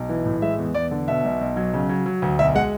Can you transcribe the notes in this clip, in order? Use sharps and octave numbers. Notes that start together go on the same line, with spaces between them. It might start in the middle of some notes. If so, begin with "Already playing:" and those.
Already playing: B1
E3
A2
G#3 E5
E2
E2 D5
D3
B2 E5
B1
B1
F#3
C#3
F#3
F#3
D2
B1 E5
G#3 F#5